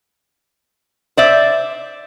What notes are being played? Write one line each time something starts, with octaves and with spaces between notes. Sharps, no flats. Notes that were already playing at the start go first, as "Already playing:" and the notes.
C5 D5 E5